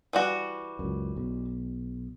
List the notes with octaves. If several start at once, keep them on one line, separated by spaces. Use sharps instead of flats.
E3 G3 F#4
C#2 F#2
B1